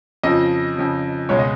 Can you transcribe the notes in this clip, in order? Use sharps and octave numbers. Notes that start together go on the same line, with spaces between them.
F2 C#3 F3 D#5
F2 C#3 F3
C#2 B2 G#3 C#5
D#5